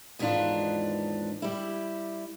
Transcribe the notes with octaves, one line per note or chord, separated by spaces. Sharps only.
D#2 G#2 E3 B3 D4 F4
G3 E4